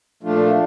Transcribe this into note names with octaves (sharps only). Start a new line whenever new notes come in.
A#2 F3 A3 D4 F4